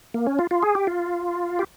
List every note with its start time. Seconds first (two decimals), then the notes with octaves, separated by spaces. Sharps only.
0.14 A#3
0.27 C#4
0.39 F4
0.51 F4
0.63 G#4
0.75 G4
0.87 F4
1.59 G4